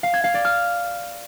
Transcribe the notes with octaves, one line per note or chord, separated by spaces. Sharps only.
F5
G#6
F5
D5
F6